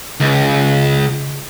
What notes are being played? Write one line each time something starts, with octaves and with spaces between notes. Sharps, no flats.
C#2